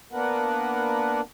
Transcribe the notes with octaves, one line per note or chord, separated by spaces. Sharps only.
A#3 B3 D4 A#4 B4 F#5